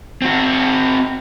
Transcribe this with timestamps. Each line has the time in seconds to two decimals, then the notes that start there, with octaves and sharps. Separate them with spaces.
0.22 C4 F#4